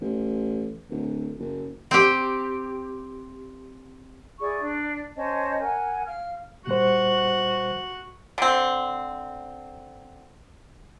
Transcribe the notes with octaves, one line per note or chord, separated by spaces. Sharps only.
A1
D1
F#1
C4 G4
E4 G#4 D5 C#6
D4
C#4 C5 D#5 A5
A#4 F#5 G#5
F5 F6
A#2 G3 F#4 C5 F#5
D3 C4